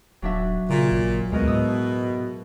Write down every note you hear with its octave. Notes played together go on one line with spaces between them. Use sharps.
D#1 F#3 D4 E5
A#2 C#3
A1
D2 B2 G#3 A#4 D#5
A2 D#6 E6